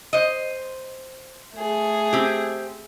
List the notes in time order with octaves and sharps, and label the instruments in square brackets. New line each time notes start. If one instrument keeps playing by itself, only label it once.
[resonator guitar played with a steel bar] C5 D#5
[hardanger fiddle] A3 G#4
[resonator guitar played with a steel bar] C4 G4